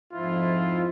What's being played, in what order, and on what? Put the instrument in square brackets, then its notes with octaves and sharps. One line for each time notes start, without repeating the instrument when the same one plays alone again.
[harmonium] F2 G#2 F3 [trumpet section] E4 F4